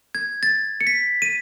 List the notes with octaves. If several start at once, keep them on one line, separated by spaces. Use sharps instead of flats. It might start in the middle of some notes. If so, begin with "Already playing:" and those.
G#6
A6
C#7
B6
D#7